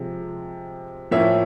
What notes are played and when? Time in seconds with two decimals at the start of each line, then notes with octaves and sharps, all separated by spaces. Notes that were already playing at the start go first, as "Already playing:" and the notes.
Already playing: C3 F3 G#3
1.11 A2 F3 A#3 C#4 E5